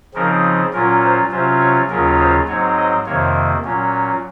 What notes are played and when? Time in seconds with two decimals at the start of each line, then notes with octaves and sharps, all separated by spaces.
0.14 C#3 F3 C4 D#4 A#4
0.73 A#2 F#3 C#4 F4 A#4
1.01 C5
1.31 C3 F#3 C#4 F4 C5
1.60 C#5
1.89 D#2 C#3 F#3 C#4 F4 A#4
2.18 C5
2.47 G#2 F#3 C4 D#4 C#5
2.77 D#5
3.06 F2 C3 D#3 A#3 C#5
3.65 A#2 F#3 C#4